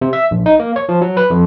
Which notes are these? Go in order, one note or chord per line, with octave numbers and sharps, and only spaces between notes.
C3
E5
A#1
D#4
A#3
C#5
F3
F#3
B4
F2